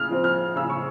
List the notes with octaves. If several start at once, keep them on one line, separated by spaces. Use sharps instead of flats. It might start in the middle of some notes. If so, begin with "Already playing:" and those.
Already playing: C#3 F6
F3 C4
F6
C#3 E6
C#6